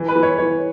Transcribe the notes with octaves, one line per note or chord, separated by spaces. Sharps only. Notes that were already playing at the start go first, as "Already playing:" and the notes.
Already playing: E3
B4
E3
C#5
E3 C#5